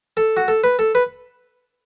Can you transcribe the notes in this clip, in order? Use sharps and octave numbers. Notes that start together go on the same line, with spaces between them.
A4
F#4
A4
B4
A4
B4